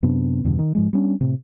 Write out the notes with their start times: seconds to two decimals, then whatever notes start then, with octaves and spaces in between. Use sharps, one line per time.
0.03 F#2 C3 B3 D4
0.44 E2 G2 B2 D3
0.59 D#3
0.75 G#2 F3 G#3
0.93 G3 B3 C#4 D4
1.21 A2 C3